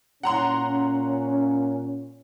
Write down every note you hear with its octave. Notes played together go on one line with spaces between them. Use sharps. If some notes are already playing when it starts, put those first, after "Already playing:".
A#2 C#4 F#5 A#5 C6